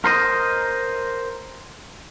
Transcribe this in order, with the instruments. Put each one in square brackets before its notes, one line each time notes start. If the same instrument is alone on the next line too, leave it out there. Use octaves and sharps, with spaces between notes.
[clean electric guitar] A#4 C5 D#5